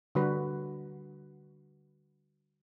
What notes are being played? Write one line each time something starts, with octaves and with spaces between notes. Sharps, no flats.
D3 G3 F#4 B4